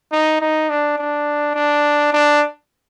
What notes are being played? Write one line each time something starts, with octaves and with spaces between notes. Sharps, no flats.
D#4
D#4
D4
D4
D4
D4